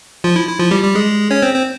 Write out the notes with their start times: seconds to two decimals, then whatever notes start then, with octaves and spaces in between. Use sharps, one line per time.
0.24 F3 F4
0.36 E4
0.48 E4
0.59 F3 F4
0.71 G3 G4
0.83 G3 G4
0.95 G#3 G#4
1.31 C#4 C#5
1.42 C4 C5
1.54 C4 C5